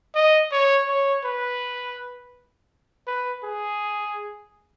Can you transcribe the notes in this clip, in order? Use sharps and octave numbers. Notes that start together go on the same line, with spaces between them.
D#5
C#5
C#5
B4
B4
G#4